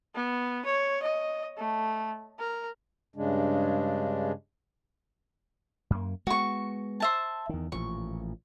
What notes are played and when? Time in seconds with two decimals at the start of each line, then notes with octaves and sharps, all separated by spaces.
0.15 B3
0.65 C#5
1.02 D#5
1.58 A3
2.39 A#4
3.16 G2 C#3 G#3 D4
5.90 F#2 A#3
6.27 G#3 B3 F#4 C#6
7.00 C5 E5 A5
7.49 E2 D#3
7.72 A1 A#2 F3 C#6